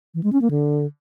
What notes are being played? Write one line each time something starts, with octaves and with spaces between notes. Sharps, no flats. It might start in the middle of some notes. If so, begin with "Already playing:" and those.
E3
G#3
C#4
A#3
D3